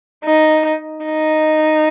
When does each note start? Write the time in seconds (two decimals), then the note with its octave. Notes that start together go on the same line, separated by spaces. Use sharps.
0.24 D#4
1.05 D#4